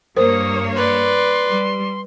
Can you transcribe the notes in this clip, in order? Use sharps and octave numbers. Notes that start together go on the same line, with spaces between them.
G2 A#3 A#4 C5 C#5 D#6
B4 D5 C6
G3